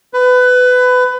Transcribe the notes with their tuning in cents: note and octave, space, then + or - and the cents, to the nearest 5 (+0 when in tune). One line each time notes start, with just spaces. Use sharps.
B4 +20